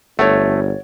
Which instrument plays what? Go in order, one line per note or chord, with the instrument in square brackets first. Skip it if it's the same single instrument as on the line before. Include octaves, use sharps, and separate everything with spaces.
[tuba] G1 [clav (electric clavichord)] A3 [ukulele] C#5 D5 F#5